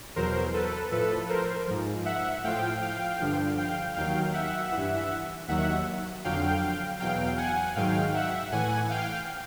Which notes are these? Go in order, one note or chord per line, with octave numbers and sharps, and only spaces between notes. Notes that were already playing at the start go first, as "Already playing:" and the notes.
E2 B2 F#3 A#4 C5
A4 B4
A2 F3 A4 B4
A#4 C5
G#2 F3
E5 F#5
A2 F3 F5 G5
F5 G5
G2 D3 F3
F5 G5
D#2 D#3 F#3 F5 G5
E5 F#5
E3
G2
D#2 D#3 F#3 E5 F#5
F2 D3 F#3 F5 G5
E2 B2 F#3 F5 G5
F#5 G#5
G#2 D#3 F#3 F5 G5
E5 F#5
A2 E3 F#5 G#5
F5 G5